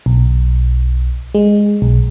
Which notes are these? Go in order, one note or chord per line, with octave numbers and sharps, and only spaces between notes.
B1
G#3
B1